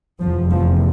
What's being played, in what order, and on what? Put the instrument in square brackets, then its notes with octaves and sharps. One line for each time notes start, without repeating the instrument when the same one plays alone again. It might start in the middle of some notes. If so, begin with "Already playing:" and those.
[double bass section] F1 E2 C3 F3
F3